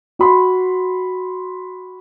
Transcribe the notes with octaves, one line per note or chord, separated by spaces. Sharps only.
F#4 B5 C6